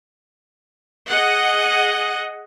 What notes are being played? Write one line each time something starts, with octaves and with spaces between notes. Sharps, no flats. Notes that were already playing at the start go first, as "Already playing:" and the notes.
G#4 D#5 F#5